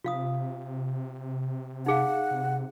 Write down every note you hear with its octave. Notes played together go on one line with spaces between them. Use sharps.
C3 F4 F5 D#6
D#4 G#4 F5 F#5
C3